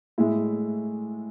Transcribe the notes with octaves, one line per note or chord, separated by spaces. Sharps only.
A2 G#3 E4